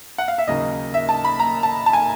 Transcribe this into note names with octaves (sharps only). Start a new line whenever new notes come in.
F#5
F5
E5
D#2 C#3 F#3 D#5
E5
A5
B5
A#5
A5
A5
G#5